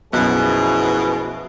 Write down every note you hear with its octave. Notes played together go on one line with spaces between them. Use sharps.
B1 F#2 B2 F3 E4 G#4